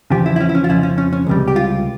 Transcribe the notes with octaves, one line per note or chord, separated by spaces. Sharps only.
E2 C#3 F3 G4
E4
E4
C#4
E4
C#4
F4
F2 C#3 F3 E4
C#4
C#4
C#4
C#2 C3 G3
G4
F4